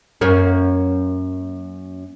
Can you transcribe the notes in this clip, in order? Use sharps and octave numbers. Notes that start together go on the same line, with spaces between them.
F#2 A#3 C#4